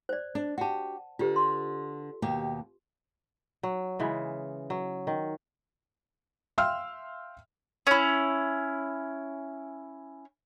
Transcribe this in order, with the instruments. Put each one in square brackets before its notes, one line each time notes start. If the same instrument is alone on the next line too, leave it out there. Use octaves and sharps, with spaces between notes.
[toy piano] C5 D5
[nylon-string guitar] D4
[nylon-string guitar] F#4 G4 [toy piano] F#5 A5
[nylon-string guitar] D3 [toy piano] F4 G4 B4
[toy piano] C6
[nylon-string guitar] D#2 B2 G4
[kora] F#3
C#3 E3 G#3
F#3
D#3
[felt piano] E5 F5 G5 C6 E6 F6
[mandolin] C#4 E4